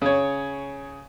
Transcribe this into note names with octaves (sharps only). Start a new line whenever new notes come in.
C#3 C#5